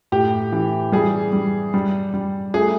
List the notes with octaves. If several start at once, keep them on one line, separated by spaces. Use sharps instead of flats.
A2 G4
E3
G3 G#4
G3
G3
G3
A3 G#4